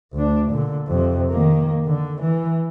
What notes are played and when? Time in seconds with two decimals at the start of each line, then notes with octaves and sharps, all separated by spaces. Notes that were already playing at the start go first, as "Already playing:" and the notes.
0.13 D2 D4
0.51 A#2 D3
0.88 F2 C3
1.30 D#3 A#3
1.86 D3
2.21 E3